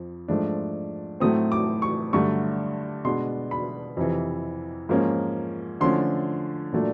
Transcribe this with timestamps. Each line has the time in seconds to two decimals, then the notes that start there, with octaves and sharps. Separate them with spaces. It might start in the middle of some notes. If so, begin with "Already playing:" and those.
Already playing: F2 F3
0.28 G#2 F3 A3 D4
1.20 A2 F#3 A3 C4 D#6
1.52 D6
1.82 C#6
2.13 G2 D3 F#3 A3 C#6
3.05 B2 G#3 B3 D4 C6
3.51 B5
3.97 F2 C3 E3
4.89 G#2 F3 A#3 C#4
5.81 D3 F3 A3 C#4 C6
6.73 A#2 F#3 A3 D4